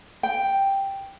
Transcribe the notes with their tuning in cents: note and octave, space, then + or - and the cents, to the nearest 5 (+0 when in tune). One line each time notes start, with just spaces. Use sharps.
G5 +0